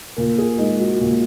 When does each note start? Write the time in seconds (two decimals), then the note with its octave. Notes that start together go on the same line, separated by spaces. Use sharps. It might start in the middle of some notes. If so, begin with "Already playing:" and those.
0.17 A#2 A#4
0.38 G#4
0.58 G#3 D#4
0.79 F#4
1.01 A#2